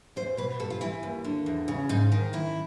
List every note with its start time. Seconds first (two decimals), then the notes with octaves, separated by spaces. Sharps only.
0.16 E2 C5
0.37 B2 B4
0.59 G2 A4
0.70 F4
0.81 E3 E4
1.03 D#2
1.24 D3
1.46 E2
1.68 C#3
1.89 G#2 D#4
2.12 D#3
2.33 F#2 E4